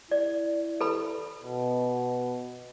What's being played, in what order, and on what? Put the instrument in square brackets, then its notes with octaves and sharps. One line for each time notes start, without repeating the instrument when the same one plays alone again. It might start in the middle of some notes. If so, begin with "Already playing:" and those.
[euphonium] E4 [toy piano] D5
[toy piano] A4 B4 B5
[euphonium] B2